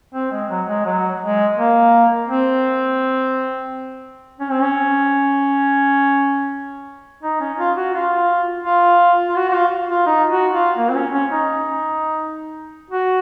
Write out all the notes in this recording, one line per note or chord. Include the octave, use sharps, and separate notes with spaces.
C4
G#3
F#3
G#3
F#3
G#3
A#3
C4
C#4
C4
C#4
D#4
C#4
F4
F#4
F4
F4
F4
F#4
F#4
F4
F4
D#4
F#4
F4
A#3
C4
C#4
C#4
D#4
F#4